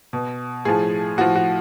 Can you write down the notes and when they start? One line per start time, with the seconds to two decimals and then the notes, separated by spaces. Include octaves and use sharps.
0.13 B2
0.65 A2 F3 G#4
1.18 A2 F3 F#4
1.36 F#4